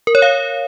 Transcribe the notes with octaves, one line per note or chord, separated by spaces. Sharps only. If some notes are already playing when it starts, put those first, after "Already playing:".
A#4
C#5
F5